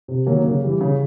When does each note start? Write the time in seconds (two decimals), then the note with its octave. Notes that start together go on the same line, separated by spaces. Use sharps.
0.08 C3
0.26 D#3 F#3 A#3
0.45 C#3
0.62 E3 G3
0.81 C#3